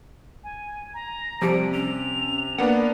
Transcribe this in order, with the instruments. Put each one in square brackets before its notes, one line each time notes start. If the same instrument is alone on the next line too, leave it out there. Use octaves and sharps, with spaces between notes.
[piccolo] G#5
A#5
[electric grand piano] C3 [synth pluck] F3 G4 [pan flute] G3 [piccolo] D7
[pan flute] C#4 [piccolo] F7
[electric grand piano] A#3 B3 D4 [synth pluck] F#5